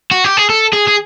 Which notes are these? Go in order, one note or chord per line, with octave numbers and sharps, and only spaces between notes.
F#4
G4
G#4
A4
G#4
G#4